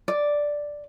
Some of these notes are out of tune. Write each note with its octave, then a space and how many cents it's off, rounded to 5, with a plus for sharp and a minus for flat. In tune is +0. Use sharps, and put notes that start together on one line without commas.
D5 +0